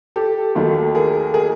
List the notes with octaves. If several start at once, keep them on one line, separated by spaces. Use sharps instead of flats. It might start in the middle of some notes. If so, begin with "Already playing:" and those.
G4 A4
D#2 D#3 F#3 A3
G#4 A#4
G#4 A#4